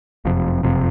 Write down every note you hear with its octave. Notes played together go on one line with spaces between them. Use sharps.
F#1 F2 C3
F#1 F2 C3